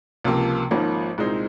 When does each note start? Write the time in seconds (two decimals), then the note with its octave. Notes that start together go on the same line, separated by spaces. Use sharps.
0.25 C#2 C3 F3 A#3
0.71 G#1 G#2 F3 A#3 C#4
1.18 C2 A#2 G#3 C4 D#4